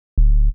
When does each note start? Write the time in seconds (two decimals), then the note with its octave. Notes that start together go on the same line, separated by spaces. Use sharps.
0.18 D1